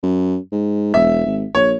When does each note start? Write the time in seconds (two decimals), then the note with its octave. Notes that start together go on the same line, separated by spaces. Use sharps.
0.03 F#2
0.52 G#2
0.94 E1 E5
1.26 G#1
1.55 A#1 C#5